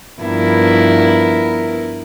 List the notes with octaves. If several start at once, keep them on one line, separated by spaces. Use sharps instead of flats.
G2 F3 B3 E4 A#4